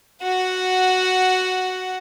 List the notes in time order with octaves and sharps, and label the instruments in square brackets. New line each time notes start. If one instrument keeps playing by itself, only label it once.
[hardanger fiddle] F#4 F#5